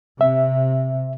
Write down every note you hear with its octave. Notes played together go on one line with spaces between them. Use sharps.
C3 E5